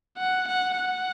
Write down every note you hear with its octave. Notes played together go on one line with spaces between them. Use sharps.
F#5
F#5
F#5